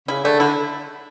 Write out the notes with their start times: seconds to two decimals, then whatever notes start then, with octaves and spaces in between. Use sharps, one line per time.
0.08 C#3 E4
0.24 D3 A3
0.40 D3 E4